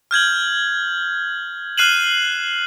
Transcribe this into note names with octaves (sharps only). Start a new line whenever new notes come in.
F6 G6 G#6 F#7
F6 F#6 C7 D#7 E7 F#7